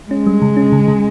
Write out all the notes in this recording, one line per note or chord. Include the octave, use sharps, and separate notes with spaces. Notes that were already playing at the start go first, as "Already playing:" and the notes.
G#3 C#4
G3
C#3
C#4
C#3
C#3